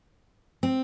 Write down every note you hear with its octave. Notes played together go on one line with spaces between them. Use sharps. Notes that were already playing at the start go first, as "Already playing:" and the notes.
C4